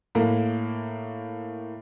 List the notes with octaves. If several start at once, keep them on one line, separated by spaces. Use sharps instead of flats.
A2 A#3